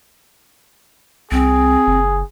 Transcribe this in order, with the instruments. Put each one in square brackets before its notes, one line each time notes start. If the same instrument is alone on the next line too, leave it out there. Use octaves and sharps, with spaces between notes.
[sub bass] C2 [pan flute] C4 [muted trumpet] G#4
[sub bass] F#1